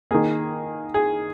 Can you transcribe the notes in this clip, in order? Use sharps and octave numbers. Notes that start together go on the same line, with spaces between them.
D#3 A#3 G#4
G#4